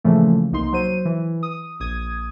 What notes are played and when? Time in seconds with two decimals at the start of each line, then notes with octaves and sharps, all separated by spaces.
0.04 A#2 C#3 E3 F3 A3
0.52 C2 A#3 D#4 C6
0.72 F#3 C5 D#7
1.05 E3
1.43 D#6
1.80 A#1 D#6 G#6